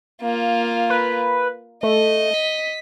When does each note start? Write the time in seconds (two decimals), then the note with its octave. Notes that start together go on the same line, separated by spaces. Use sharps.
0.22 A#3 F4
0.90 B4
1.83 A3 D#5
2.34 B6